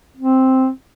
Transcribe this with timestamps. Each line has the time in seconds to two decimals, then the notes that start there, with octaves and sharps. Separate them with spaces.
0.17 C4